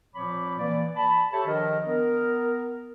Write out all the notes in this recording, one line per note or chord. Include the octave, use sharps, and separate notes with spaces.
A#2 F3 C4 C#5 B5 D6
E3 A#3 D5
A5 B5
G4 A4 C#5 E5 A5
D#3 F3 D4 A#4 D#5
B3 A#4